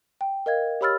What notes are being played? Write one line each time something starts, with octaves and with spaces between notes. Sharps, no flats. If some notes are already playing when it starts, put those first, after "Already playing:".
G5
A#4 D#5 F5 G#6
G4 C#5 B5 E6 F6 A6